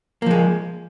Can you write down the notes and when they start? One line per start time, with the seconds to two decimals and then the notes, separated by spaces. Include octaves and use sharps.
0.22 A#3
0.26 F3
0.31 G#3